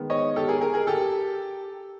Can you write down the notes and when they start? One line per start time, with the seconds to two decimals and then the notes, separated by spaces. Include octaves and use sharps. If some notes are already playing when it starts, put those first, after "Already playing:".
Already playing: D#3 G#3 B3
0.10 C#5 D#5
0.36 G4 A4
0.48 G#4 A#4
0.61 G#4 A#4
0.74 G#4 A#4
0.87 G4 A4